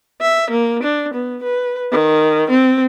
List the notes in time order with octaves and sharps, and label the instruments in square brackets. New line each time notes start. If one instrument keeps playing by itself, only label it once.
[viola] E5
A#3
D4
B3
B4
D#3
C4